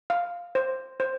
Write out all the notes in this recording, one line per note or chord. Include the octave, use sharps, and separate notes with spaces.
F5
C5
C5